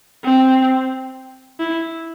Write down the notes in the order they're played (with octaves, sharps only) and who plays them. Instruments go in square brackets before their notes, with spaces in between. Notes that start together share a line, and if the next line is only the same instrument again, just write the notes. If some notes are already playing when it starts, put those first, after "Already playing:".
[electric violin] C4
E4